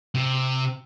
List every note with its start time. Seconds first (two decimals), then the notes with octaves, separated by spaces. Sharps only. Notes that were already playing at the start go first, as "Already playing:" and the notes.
0.15 C3